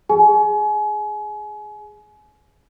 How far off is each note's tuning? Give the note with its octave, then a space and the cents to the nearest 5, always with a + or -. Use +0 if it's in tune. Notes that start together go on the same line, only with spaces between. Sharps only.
G#4 +0 G#5 +30